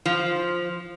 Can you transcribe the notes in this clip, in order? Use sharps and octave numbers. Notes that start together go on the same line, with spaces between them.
F3